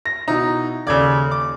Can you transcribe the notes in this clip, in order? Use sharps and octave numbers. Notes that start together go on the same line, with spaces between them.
A#6
B2 D#4 E4 A#5
D#2 C#3 A4 D5 G#6
D6